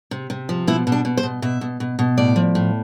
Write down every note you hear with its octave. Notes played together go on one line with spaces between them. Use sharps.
C3
C3
F3
B2 E4
B2
D4
B2
C5
B2
B2 E5
B2
B2
B2
A2 D5
F3
A2